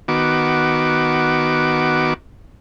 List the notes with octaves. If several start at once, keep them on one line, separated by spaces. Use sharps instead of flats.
D#3 B3 F#4 D6